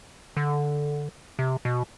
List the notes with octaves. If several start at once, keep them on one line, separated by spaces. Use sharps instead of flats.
D3
C3
B2